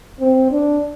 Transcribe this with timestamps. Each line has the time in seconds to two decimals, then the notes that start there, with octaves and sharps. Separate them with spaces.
0.20 C4
0.51 D4